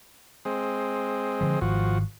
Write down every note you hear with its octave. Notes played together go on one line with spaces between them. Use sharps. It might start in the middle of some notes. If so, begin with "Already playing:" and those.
G#3 C4
D3 F3
G#1 F3 F#4